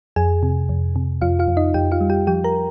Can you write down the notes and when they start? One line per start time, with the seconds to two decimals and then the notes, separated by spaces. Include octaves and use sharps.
0.16 F2 G#4 G#5
0.43 C3
0.69 F2
0.96 C3
1.21 F2 F4 F5
1.39 F4 F5
1.48 F2
1.57 D#4 D#5
1.74 F2 G4 G5
1.91 F4 F5
2.01 G3
2.10 G4 G5
2.27 F3 G4 G5
2.44 A#4 A#5